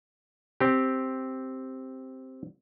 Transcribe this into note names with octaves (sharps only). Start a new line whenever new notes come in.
C4 G4